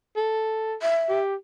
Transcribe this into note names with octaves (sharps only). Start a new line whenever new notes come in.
A4
E5
G4